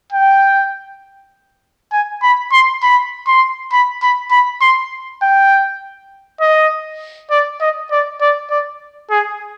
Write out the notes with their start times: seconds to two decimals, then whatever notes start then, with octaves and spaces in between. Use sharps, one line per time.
0.12 G5
1.93 G#5
2.23 B5
2.52 C6
2.82 B5
3.27 C6
3.72 B5
4.03 B5
4.31 B5
4.62 C6
5.22 G5
6.41 D#5
7.31 D5
7.61 D#5
7.91 D5
8.21 D5
8.51 D5
9.11 G#4